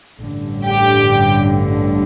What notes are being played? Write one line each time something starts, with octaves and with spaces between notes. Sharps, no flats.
A1 G2 D3
G4 G5